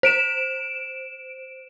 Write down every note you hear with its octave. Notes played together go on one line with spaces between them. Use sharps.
C5 D7 E7